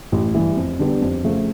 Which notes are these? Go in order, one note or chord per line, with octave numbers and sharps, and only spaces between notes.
A1
G2 E3
F2
D3 G3 B3 D4
F2
C#3 F3 A3